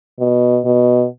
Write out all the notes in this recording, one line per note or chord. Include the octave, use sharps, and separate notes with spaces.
B2
B2